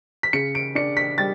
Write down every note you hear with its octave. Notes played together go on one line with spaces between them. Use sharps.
B6
C#3 C#7
D7
D4 C#7
B6
G3 A6